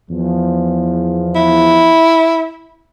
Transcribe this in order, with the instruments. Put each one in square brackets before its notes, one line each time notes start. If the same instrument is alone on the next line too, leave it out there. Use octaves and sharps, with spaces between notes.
[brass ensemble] E2 F3
[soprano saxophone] E4